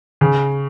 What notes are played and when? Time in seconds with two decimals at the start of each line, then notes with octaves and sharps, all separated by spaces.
0.21 C#3